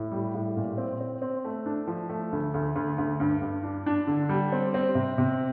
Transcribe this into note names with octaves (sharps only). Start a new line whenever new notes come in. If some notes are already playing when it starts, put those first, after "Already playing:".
Already playing: A2
G3
A2
A#2
C4
C4
C4
A3
D4
F3
A3
D2
D2
D2
D2
G2
G2
D4
D4
D3
G3
C4
C4
C3
C3